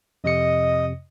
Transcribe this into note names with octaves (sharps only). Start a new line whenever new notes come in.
F2 C3 D#5 C#7